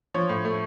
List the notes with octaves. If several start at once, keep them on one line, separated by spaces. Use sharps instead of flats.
F3 C#5
A2
A3